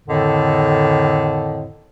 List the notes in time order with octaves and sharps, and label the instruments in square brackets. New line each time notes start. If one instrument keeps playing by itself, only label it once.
[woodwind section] F2 A2 D3 D#3